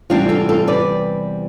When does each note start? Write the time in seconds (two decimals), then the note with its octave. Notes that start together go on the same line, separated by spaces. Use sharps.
0.10 E2 C3 G3 D4 F4
0.29 F4 A4
0.49 F4 A4
0.67 B4 D5